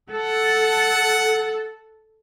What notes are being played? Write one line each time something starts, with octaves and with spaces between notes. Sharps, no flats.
A4 F#5